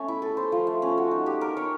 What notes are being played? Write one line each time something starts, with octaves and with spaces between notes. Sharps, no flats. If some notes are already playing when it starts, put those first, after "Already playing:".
Already playing: A3 C#4
E4
A4
C5
F3
A3
C#4
F#4
D#4
G4
A#4
C#5